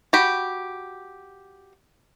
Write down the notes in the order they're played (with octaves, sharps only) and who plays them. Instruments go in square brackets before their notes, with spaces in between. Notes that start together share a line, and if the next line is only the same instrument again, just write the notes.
[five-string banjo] F#4 G4 B5